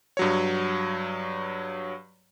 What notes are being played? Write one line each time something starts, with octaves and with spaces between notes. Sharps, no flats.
G2 F#3 C#5